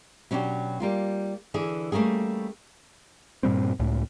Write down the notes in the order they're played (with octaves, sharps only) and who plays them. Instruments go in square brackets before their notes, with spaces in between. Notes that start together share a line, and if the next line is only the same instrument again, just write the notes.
[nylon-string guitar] B2 F#3 C#4 D4 G4
G3 A#3 F4
D3 E3 G#4
G3 A3 A#3 C#4 G#4
[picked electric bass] G2 A#2 G3 C4
C#2 A2